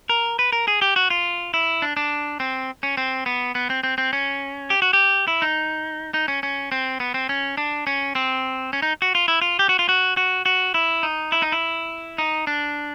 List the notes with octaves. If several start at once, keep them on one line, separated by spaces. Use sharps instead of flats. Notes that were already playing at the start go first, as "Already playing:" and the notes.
A#4
B4
A#4
G#4
G4
F#4
F4
E4
D4
D4
C4
C#4
C4
B3
B3
C4
C4
C4
C#4
G4
F#4
G4
E4
D#4
D#4
C#4
C#4
C4
B3
C4
C#4
D4
C#4
C4
C#4
D#4
F#4
F4
E4
F4
G4
F#4
F4
F#4
F#4
F#4
E4
D#4
E4
D#4
E4
D#4
D4